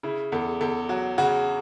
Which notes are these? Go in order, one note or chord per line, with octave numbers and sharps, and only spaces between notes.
C#3 E4
E2 A4
E2 A4
F#3 F#4
C#3 F#4